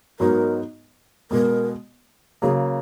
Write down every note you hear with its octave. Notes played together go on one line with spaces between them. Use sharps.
G#2 F#3 B3 D#4 F#4 A#4
B2 G#3 B3 A#4
C#3 F#3 A#3 G#4